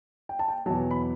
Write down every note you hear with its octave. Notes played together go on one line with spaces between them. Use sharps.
G5
A5
G5
E2 B2 F#3 A5
B5